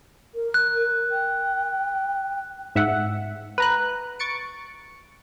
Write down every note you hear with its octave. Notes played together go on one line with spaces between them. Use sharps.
A#4
F#6
G5
G#2 E5 F#5
B4 A#5 F#6
C#6 A6 C#7 D7